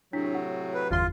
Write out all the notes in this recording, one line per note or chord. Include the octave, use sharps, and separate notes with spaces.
A2 C3 F#3 D4 E4 B6
F#5
B4
G1 E2 F4 C6